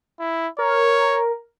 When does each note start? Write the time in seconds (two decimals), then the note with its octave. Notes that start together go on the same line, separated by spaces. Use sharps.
0.20 E4
0.59 A#4 C#5